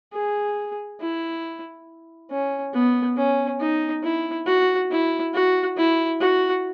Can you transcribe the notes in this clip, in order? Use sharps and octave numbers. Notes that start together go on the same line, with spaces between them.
G#4
E4
C#4
B3
C#4
D#4
E4
F#4
E4
F#4
E4
F#4